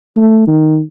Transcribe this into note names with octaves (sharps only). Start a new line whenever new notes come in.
A3
D#3